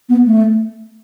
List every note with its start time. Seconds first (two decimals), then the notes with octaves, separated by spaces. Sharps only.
0.09 B3
0.26 A3